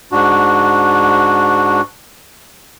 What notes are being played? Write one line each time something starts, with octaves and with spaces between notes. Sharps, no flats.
G#2 D4 F#4